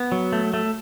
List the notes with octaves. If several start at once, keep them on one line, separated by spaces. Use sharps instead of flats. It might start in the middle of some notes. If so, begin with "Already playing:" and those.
Already playing: B3
F#3
A3
A3